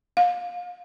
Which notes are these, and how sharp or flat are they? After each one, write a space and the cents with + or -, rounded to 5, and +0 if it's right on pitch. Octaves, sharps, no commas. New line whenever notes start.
F5 +30